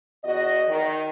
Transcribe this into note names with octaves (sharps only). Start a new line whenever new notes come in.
E2 F#4 D#5
D#3